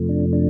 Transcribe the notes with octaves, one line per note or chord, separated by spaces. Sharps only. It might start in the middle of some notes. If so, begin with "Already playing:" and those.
Already playing: F2 C3 F3 A3
D4
D4